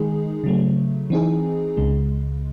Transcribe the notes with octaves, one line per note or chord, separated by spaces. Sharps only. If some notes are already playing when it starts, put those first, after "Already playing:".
Already playing: D#3 G#3 D#4 G#4
C#3 F#3 A3
E3 C4 D#4 G#4
C#2 C#3 G#3